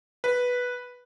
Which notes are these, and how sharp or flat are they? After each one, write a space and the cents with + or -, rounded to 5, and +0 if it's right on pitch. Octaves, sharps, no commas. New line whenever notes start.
B4 -5